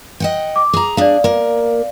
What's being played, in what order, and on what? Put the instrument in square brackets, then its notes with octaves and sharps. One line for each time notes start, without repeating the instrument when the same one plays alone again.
[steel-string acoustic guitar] D#5 F#5 G5
[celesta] D6
[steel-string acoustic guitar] G#4 A#5
[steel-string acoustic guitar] D4 G#4 [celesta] D5 F5
[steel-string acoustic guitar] A#3 A#4